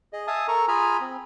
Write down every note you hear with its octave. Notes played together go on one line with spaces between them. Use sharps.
G#4 D#5
E5 F5 G#5 A5 D#6
A4 A#4 A#5 C#6
F4 G#4 G#5 A#5 B5 F6
C4